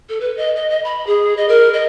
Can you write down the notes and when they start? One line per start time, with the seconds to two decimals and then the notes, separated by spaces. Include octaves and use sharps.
0.09 A4
0.21 B4
0.37 D#5
0.56 D#5
0.70 D#5
0.84 B5
1.07 G#4
1.37 D#5
1.48 A#4
1.73 D#5